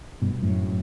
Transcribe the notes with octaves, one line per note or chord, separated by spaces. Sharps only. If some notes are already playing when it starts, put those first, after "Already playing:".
G2 B2
F#2 A2